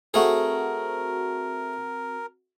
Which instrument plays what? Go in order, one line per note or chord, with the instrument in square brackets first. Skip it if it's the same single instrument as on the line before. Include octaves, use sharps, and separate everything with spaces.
[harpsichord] A3 G#4 [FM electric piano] C4 F#4 [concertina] A#4